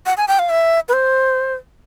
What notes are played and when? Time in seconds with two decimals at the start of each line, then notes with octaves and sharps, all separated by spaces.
0.06 F#5
0.17 G#5
0.28 G5
0.39 F5
0.50 E5
0.89 B4
0.93 C5